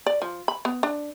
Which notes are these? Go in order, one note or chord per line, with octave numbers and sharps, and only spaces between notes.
D5
F3
B5
B3
D4